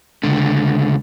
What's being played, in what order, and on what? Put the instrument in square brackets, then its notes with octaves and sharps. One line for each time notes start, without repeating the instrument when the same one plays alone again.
[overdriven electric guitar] C#2 D3